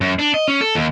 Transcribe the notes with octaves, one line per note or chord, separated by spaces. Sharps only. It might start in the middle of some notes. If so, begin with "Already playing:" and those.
F#2
D4
D#5
C#4
A4
D#2